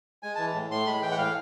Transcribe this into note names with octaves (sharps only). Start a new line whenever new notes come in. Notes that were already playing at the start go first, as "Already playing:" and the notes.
G#3 G#5
E3 A5
A2
A2 C6
G#3 B5
E3 G5
F#5
A2 F5